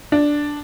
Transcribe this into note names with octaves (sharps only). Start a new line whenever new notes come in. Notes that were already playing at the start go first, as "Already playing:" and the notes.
D4